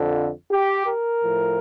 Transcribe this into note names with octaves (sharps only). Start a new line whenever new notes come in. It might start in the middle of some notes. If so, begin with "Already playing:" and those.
Already playing: F2 D3 F3
G4
A#4
A2 F3